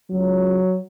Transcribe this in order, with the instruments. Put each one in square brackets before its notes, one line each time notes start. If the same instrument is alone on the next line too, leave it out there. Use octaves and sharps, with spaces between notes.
[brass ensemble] C#2 C#3 F#3